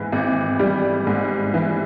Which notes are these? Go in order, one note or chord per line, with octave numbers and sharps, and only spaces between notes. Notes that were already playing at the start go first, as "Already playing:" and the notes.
Already playing: G#2 E3
G#1
G3
G#2
E3